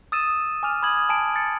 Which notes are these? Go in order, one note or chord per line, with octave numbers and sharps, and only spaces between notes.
D#6 E6 A6 D#7 E7
G#5 D6 F6 F7
B5 D#6 G#6 F#7
G#5 A5 D7
A6 C#7